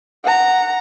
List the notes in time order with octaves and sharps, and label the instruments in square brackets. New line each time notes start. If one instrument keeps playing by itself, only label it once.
[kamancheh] F#5 A#5